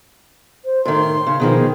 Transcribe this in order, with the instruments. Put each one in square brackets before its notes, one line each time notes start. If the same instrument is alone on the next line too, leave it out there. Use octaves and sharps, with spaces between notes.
[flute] C5
[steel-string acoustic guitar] A2 D#3 [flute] C6
[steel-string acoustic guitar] C#3
[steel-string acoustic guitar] B2 D#3 F3 [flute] G#4